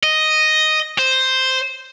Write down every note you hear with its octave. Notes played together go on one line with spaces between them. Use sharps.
D#5
C5